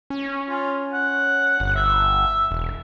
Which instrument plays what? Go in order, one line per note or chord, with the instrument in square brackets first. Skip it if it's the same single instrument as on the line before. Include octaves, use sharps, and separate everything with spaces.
[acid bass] C#4
[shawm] F4
F#5
[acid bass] G1
[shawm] E5
[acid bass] E1